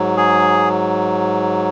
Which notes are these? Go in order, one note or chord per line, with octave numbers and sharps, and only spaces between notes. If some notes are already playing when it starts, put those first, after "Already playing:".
Already playing: G#2 F#3
G#4